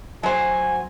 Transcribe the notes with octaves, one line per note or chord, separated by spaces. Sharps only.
F#3 C5 G#5